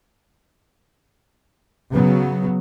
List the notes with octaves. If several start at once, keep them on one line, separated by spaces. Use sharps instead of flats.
C#3 F#3 B3